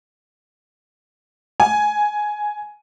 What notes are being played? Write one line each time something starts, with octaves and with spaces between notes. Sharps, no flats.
G#5